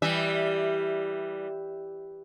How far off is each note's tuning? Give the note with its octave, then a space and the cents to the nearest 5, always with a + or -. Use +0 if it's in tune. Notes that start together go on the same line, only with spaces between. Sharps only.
E3 +0 G3 +0 E5 -10